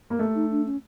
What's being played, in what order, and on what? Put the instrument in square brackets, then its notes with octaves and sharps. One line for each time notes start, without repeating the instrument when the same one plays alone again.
[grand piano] A#3
A3
[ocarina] D#4
D4
C#4